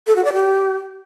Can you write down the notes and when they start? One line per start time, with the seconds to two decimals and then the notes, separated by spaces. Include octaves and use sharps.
0.07 A4
0.16 F#4
0.25 D5
0.34 G4